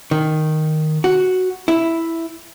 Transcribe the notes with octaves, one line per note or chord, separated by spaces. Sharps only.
D#3
F#4
E4